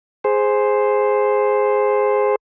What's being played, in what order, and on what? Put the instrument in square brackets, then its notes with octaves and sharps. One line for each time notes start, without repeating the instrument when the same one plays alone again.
[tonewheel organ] G#4 C5